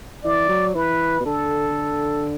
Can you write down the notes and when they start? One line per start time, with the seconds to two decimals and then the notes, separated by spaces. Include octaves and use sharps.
0.24 E3 D5
0.49 F#3
0.75 E3 B4
1.20 B2
1.26 D3 A4